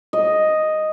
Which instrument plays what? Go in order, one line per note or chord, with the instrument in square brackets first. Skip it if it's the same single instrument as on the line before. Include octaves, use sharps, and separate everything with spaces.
[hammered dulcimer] D#5